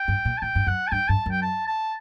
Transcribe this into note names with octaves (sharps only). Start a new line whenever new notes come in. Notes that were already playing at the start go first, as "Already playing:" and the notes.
Already playing: G5
G2
A#2
A5
A2 G5
G2
F#2 F#5
A5
G2 G5
G2 A5
F#2
G5
A5
A5